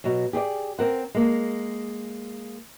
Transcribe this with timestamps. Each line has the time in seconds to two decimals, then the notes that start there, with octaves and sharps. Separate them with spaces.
0.04 B2 F#3
0.33 G4 G#4 C#5 D5
0.79 C4 A#4 F#5
1.15 G#3 A#3